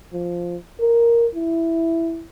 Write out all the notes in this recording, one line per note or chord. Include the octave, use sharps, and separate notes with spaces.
F3
A#4
E4